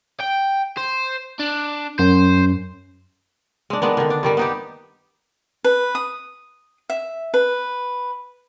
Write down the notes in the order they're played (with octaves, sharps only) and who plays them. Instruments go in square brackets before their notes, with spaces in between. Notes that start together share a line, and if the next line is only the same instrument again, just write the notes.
[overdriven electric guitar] G5
C5
D4
[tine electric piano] F#2 [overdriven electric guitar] C5
[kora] G#3 D4
D#3 G#3 B3 D4
D3 D#3
D4
G2 D#3 G3
B3 D#4 G4
[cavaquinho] B4
D#6
E5
B4